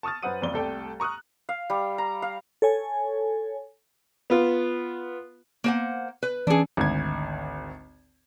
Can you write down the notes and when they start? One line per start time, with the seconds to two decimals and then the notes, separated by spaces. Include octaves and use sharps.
0.03 A5 C#6 D#6 F6 A6
0.23 F#2 B4 C5 F#5 D#6 D#7
0.42 F#1 F2 D5 G7
0.53 C2 A3 A4 D5 G5
1.00 A#5 C#6 D#6 F6 F#6
1.49 F5
1.70 G3
1.98 A#5
2.22 F5
2.62 A4 C#5 G#5
4.30 B3 F4
5.64 A#3 C5 F#5
6.23 B4
6.47 E3 C#4 D4 G#4
6.77 G#1 D2 G#6